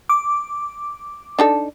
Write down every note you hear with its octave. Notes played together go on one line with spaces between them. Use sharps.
D6
D4 D#4 A4